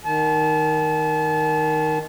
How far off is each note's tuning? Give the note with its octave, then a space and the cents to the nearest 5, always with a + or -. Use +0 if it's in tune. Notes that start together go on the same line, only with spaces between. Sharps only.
D#3 +0 A5 -35